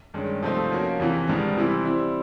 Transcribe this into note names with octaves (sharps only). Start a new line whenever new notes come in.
G2 D#3 G#3 C#4
C3 F3 A3 C4 D#4
F3 A#3 C#4 F#4 A#4
E2 C3 E3
G#2 D#3 G3 B3 D4
C3 E3 G3 C4 E4
G3 C4 E4